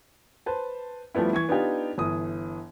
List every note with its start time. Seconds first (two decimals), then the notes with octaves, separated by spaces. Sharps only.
0.46 B4 C5 A5
1.15 F3 G3 A3 B3 E4
1.33 E3 C#6 G#6
1.49 B3 D4 D#4 F4 G4
1.98 G1 E3 D#6